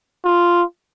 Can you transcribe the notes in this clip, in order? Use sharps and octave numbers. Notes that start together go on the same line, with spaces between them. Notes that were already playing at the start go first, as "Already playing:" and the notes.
F4